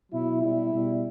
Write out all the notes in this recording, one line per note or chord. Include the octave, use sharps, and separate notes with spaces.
B2 F#3 E4
B2 G3 E4
B2 G3